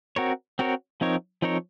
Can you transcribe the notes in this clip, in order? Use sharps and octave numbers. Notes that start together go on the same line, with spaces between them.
C4 F#4 A#4 C#5
C4 F#4 A#4 C#5
F3 C4 D#4 A#4 C#5
F3 C4 D#4 A#4 C#5